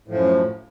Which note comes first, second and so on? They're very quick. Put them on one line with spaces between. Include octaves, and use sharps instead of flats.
A2 F3 F#2